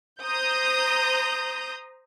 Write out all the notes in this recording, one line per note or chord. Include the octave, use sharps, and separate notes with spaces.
C5 A#5 D#6 G6